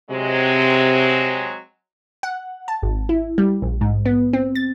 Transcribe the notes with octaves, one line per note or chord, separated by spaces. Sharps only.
C3 F#3 G#3 C4
F#5
A5
G#1
E4
G3
A#1
G#2
B3
C4
A6